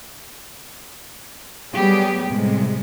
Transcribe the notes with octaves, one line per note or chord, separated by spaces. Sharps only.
F#3 G3 A3 B3 G4 G#4
A2 C3 G3 G#3